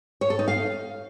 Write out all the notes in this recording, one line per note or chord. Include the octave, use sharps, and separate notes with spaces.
C#5
A4
D#4
F5